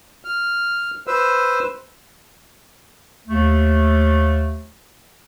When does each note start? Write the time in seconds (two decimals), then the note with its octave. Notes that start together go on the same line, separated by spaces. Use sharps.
0.25 F6
1.07 B4 C5 E6
3.27 D#2 A3